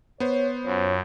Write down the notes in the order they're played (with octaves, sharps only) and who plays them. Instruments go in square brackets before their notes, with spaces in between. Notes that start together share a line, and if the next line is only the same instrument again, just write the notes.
[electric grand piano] B3 C5 [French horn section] C#5
[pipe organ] F#2 [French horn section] C#4 F4 C#5